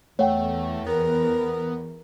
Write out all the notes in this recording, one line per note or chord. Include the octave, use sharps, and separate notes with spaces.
E2 A3 C#5 F#5 G5
B3 A#4